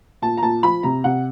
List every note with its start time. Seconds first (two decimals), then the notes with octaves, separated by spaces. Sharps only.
0.22 A#2 A5
0.37 A#5
0.42 A#2 A5
0.63 F3 B5
0.83 C3 A#5
1.04 C3 F#5